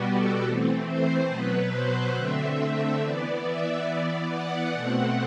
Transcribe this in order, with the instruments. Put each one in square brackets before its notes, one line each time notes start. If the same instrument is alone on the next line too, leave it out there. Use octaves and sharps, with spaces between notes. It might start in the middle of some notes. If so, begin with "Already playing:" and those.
Already playing: [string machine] B2 G3 B3 F#4 G4
A4
E3 A3 C4
C5
B2 F#3 B3 B4
C5
D3 A3 C4 E5
E3 B3 D5
E5
E3 B3 D5
F#5
B2 A3 C4 F#5